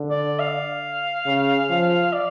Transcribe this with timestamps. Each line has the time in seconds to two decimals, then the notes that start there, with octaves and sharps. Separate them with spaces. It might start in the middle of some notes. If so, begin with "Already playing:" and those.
Already playing: D3
0.10 D5
0.39 F5
1.26 C#3
1.70 F3
2.13 D5